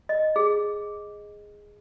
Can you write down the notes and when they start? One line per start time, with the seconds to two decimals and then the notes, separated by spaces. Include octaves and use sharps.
0.09 D#5
0.36 G#4